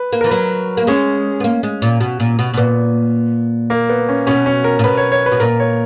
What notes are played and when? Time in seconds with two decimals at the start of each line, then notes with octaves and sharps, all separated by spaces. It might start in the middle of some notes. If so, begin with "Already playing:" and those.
Already playing: B4
0.13 A#3
0.21 E3 A#4
0.31 F#3 B4
0.77 A#3
0.87 G#3 C#4
1.40 B3
1.44 A#3
1.63 G#3
1.82 A#2
2.00 B2
2.20 A#2
2.39 B2
2.54 B2
2.57 A#2 B3
3.70 A#3
3.89 B3
4.09 C#4
4.27 B2 C#4
4.46 C#4
4.64 A#4
4.79 A#2
4.84 B2 B4
4.97 C#5
5.12 C#5
5.26 B4
5.32 B2
5.40 A#2 A#4
5.60 C#5